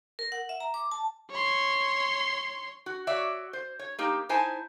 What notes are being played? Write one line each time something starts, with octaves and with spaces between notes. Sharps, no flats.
A#4
F#5
E5
A#5
D6
A5
C#5 C6
F#4
F#4 C#5 D5 E5
C5
C#5
A#3 D#4 G4
D#4 E4 C5 G#5 A5